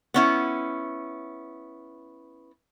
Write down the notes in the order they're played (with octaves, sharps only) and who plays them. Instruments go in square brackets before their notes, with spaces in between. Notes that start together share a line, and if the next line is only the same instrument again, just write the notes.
[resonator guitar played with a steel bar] B3 C#4 E4